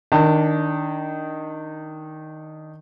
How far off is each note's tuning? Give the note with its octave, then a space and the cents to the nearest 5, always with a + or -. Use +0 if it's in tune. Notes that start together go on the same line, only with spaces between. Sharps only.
D#3 +0 D4 -15 A5 +45